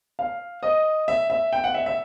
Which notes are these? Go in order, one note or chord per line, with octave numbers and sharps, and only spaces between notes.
F5
D#5
E5
E5
G5
F#5
E5
E5